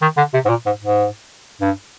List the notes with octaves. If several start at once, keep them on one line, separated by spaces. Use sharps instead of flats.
D#3
D3
C3
G#2
A#2
G#2
G#2
G2